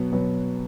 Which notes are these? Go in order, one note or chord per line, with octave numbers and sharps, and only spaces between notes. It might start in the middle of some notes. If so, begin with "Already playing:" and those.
Already playing: B2 F#3 B3
B2 F#3 B3